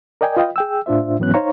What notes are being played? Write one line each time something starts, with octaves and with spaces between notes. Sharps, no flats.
A#4 D5 D#5 G5 G#5
F4 B4 D#5 F5 G5
G#4 G5 E6
A2 D4 F4 C5 E5
G#2 E3 F#3 B3 C#4 F#6
D#4 C5 C#5 F5 A#5 C#6